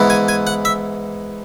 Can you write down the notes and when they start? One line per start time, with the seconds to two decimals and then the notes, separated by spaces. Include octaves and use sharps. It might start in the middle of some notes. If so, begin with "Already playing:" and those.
Already playing: G#2 E3 B3
0.10 G#5
0.28 G#5
0.47 F#5
0.65 E5